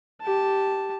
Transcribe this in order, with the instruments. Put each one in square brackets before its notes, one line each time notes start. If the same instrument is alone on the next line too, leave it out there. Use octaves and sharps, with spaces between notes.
[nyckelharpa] G4 A5